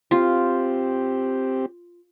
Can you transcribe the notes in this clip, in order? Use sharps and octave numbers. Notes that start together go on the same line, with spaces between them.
C4 F4 G4